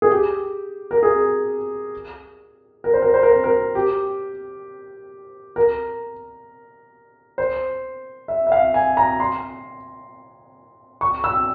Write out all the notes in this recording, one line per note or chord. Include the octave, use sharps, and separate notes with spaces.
G#4
G4
A#4
G#4
A#4
C5
A#4
C5
A#4
C5
A#4
G4
A#4
C5
E5
E5
F5
G#5
A#5
C6
C#6
E6